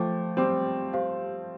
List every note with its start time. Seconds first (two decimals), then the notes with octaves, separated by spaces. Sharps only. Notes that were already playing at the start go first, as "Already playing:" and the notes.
Already playing: F3 A3 C5 G5 D6
0.37 G3 C4 C5 G5 D6
0.93 G4 C5 F5